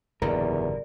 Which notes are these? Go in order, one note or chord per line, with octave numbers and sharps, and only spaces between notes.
F#1 E2 G#2 D3 G3 A#4